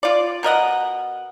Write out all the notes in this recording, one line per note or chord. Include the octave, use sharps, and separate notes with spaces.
F4 D5
B2 A#4 D#5 F#5